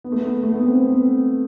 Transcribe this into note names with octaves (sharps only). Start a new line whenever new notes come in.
B3
A3
B3
A3
B3
C4
B3